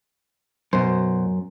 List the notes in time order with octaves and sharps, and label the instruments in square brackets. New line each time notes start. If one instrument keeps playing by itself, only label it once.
[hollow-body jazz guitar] F#2 [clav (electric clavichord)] B2 C5